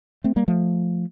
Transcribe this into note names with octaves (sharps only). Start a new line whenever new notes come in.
A3 C4
G3 A#3
F3 A3